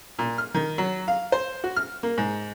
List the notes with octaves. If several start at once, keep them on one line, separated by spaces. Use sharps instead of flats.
A#2
F6
D#3
F#3
F5
C5
F#4
F6
A#3
G#2